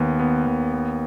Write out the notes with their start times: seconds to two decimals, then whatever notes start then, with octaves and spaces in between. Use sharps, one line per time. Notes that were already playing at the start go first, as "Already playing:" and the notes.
Already playing: D#2 B3
0.20 B3
0.47 D#2
0.73 B3